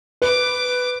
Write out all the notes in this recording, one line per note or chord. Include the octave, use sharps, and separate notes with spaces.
B4 D6